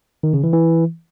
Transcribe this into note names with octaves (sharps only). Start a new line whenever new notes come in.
D#3
C#3
E3
E3